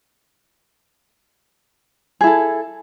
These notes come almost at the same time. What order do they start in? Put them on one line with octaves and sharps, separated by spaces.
G#4 E4 A4